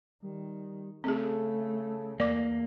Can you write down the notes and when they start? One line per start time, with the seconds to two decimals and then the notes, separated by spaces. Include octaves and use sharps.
0.22 D#3 G3
1.04 C#3 A3 C4 G#4 A4
2.20 E2 A#3 D5 D6